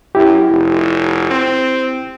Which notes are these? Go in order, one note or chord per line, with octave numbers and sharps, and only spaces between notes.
F#2 E4 G4
F1
C4